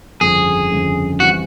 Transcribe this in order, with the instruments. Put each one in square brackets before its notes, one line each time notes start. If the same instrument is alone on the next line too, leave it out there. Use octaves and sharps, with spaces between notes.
[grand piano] G1 F2 C#3 F3 G#3 [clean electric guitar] G#4
[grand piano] G1 F2 C#3 F3 G#3
[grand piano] E3 G3 C4 [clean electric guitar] F#4